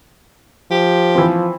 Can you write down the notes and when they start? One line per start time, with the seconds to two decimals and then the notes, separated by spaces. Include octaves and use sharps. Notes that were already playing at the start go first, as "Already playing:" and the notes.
0.71 F3 G4
1.15 E3 C4